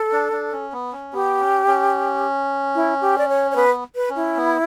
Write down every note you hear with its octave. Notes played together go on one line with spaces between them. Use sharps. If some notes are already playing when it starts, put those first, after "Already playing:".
Already playing: A4
D4
D4
C#4
B3
C#4
B3 G4
C#4
C#4
E4
G4
D5
C#5
C#5
B3 B4
B4
C#4
E4
B3